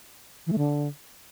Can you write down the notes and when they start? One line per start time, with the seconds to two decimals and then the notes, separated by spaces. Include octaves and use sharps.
0.47 E3
0.52 A3
0.58 D3